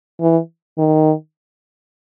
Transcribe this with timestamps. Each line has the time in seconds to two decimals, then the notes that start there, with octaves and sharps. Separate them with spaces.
0.21 E3
0.78 D#3